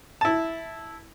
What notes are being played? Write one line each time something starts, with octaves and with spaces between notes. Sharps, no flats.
E4 A5